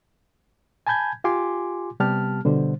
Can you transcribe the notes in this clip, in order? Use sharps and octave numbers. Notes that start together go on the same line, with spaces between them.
G#5 A5 B5 G6 G#6
F4 G4 G#5 C6 D6
C3 G3 B3 G4 A5 F6
B2 D3 G3 C5